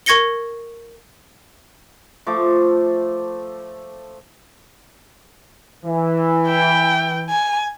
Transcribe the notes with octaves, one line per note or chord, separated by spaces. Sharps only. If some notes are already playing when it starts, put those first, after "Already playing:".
A#4 C#6 G#6 A#6 C#7 G7
F3 A3 A4 D6
E3
G5
G#5